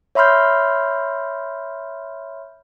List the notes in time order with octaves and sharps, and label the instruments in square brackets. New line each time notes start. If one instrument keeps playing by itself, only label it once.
[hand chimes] C#5 E5 B5 C6 F6 G6